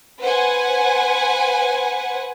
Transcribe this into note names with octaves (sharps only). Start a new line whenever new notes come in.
B4 C5 F#5 G#5